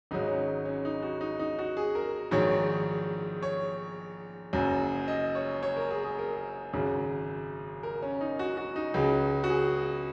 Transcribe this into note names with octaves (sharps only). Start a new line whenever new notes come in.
G#1 G#2 F#3 D#4
C#4
C#4
D#4
F#4
D#4
D#4
F#4
G#4
A#4
A#1 G#2 D#3 F#3 C#5
C#5
F#1 F#2 F#3
D#5
C#5
C#5
A#4
G#4
G#4
A#4
G#1 F#2 C#3 F#3
A#4
C#4
D#4
F#4
F#4
D#4
C#2 C#3 F#3
F#4
G#4